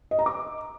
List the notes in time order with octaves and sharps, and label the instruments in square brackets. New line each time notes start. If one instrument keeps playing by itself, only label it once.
[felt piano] D#5
A#5
D6